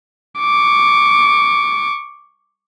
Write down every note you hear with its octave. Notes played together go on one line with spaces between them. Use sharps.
C#6 D6